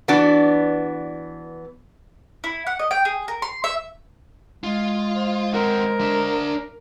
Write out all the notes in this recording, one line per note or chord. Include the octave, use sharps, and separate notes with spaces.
E3 B3 D4 F#4 D5
E4
F#5
D#5
G5
G#4
A#4
C6
E5
G#3 F4
C5
C4 F#4 A#4
D4 E5